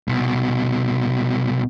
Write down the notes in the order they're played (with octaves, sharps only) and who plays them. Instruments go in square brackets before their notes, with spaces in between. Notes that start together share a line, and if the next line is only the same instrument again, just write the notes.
[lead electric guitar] C2 B2